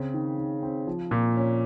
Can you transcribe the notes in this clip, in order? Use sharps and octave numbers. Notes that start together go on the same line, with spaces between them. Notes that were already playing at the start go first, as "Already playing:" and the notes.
Already playing: C#3 C4
D#3
D#3
C4
F3
A#2
C#4